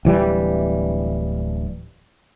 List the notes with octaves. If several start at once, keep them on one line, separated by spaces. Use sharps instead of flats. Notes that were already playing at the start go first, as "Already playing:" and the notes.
D1 E3 G3